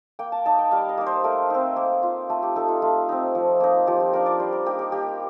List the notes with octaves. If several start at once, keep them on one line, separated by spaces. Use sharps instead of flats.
A#3 G5
A5
D#4 A5
G5
G3 F5
D#5
A#3 D#4
C5
A3 A#4
C4 D#4
A#3
F4
A3 A4
G4
D#4 A4
F4
A3 F4
C4 D#4
F3
A#3 D#4
F3 G4
G4
A#3 D4 A#4
D5
G3 C5
A#4
A#3 D#4 G4
A#4
A#3 G4